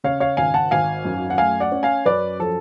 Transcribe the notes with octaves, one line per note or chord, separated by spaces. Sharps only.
C#3 C#5 F5
C#5 F5
G#1 F5 G#5
F#5 A5
G#1 F5 G#5
F#2
F#5
A3 F5 G#5
D5 F#5
C#4
F5 G#5
F#2 B4 D5
F3 A4